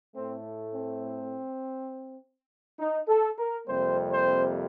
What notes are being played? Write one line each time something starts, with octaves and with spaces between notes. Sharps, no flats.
A2 A3 C4
C4
D#4
A4
A#4
F2 C3 G3 A#3 C5
C5